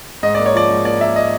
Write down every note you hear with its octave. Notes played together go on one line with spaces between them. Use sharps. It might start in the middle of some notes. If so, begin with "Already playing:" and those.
G#2 D#5
A#3 D5
C#5
F3 D5
G#2
A#3 D5
A#3 E5
D#5